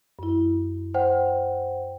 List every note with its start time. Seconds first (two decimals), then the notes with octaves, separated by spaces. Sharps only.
0.19 F#2 E4
0.94 C5 F#5 G5